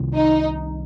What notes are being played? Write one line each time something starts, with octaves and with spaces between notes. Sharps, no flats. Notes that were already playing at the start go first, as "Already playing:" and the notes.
Already playing: C2 C3 D#3
D#4